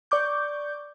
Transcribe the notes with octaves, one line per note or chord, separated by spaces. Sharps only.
D5 C#6 D6 G6